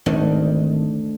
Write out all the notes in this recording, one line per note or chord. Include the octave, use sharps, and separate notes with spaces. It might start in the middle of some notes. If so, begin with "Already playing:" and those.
G#1 D2 D#3